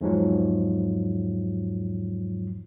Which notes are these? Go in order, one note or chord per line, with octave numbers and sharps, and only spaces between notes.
E2 G#2 F3 F#3